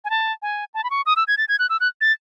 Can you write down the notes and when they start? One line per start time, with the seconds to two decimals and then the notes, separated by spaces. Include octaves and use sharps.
0.05 G#5
0.10 A5
0.42 G#5
0.74 A5
0.84 B5
0.90 C#6
1.06 D#6
1.16 E6
1.28 G#6
1.38 A6
1.49 G#6
1.59 F#6
1.70 E6
1.80 F#6
2.01 A6